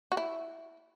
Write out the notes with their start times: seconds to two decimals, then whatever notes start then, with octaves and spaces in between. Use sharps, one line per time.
0.12 F#4
0.17 E4